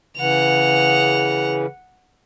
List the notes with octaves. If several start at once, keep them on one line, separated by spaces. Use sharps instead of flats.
C#3 E3 F#5 F7